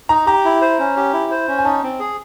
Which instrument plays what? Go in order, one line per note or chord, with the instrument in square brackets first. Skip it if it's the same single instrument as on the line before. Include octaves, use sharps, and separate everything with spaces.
[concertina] D#4 [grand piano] A#5
[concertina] G4 [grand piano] A#5
[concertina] E4
C5
C#4
G4
E4
C5
C#4
[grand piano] G#5
[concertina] D#4 [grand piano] A5
[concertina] C4
G#4